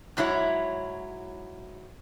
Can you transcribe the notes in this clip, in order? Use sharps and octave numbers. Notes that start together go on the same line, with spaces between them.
G#2 F#3 D4 E4 C#5